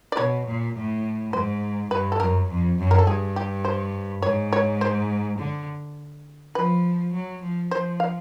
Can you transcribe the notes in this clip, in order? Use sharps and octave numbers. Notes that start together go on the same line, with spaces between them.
D5
B2 C#5
A#2
A2
G#2 C5
G2 B4
A4
F#2 A#4
F2
F#2
A#4
A4
G2 G#4
G4
C5
G#2 C#5
C#5
C5
D3
F3 B4
F#3
F3
F3 C5
F5